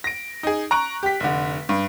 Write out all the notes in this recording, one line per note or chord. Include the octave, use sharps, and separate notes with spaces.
A#6 D7
D#4 G#4
A#5 C#6 F#6 D7
G4 B6
F1 D3
G2